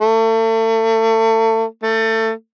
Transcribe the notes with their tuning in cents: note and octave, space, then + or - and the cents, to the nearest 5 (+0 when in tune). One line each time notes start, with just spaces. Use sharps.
A3 +35
A3 +25